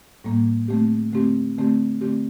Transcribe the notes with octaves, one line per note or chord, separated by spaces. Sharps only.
A2 G3 A#3
D3 A3 C4 G4
D3 A3 C4 G4
D3 A3 C4 G4
D3 A3 C4 G4